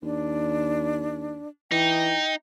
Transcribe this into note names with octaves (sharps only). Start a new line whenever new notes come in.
D#2 D4
E3 D#4 G5